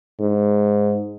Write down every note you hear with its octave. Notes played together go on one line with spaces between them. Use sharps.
G#2